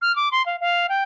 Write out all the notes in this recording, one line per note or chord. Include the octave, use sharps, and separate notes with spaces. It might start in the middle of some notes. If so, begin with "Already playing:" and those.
F6
D6
C6
F5
F5
G5